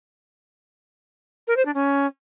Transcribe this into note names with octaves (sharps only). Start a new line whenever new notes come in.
A#4
C5
D4
C#4